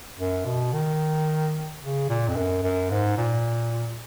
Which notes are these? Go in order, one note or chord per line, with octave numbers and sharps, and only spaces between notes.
F#2
B2
D#3
C#3
A#2
F2
F#2
F#2
G#2
A#2